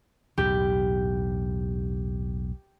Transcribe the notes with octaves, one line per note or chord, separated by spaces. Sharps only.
B1 E2 A2 G4